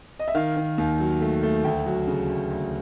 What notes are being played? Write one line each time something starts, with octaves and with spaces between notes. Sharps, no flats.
D#5
E5
D#3 F5
D#3
D#2
F#3
A3
A3
D2 G5
F#3
C#3
D2
D2